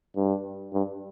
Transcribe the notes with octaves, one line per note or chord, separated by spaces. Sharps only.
G2
G2